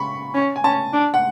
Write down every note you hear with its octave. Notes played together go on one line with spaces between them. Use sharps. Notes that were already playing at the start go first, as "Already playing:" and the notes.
Already playing: B5 C#6
C#4
G#5
C#4 A5
D4
F#5